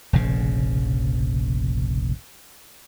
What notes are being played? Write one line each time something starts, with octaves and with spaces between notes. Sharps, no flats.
F1 A#1 C#3